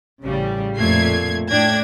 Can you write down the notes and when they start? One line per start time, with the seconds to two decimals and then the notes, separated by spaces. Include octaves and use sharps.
0.24 A1 C#3 G3
0.77 F2 A#2 A3 G#6 C7
1.49 A2 D4 G5 G#6 A#6